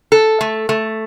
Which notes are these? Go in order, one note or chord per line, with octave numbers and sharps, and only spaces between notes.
A4
A3
A3